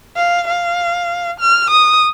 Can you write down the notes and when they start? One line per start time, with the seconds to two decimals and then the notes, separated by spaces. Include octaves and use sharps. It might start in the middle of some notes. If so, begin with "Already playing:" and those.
0.17 F5
0.48 F5
1.40 F6
1.70 D#6